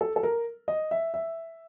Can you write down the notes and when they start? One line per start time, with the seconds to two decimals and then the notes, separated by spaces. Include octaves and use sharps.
0.01 A4
0.16 A4
0.23 A#4
0.68 D#5
0.91 E5
1.14 E5